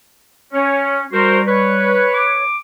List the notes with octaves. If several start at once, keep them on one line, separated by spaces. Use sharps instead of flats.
C#4 C#5
G3 F#4 A#4 C5
B4 C#5
D6